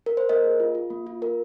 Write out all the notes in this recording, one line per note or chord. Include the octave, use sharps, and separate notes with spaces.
A#4
C5
A#3 A#4 D#5
G#4
F4
F4
A#3
F4
F4 A#4